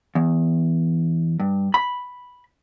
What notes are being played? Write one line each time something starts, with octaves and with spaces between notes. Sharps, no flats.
E2
G2
B5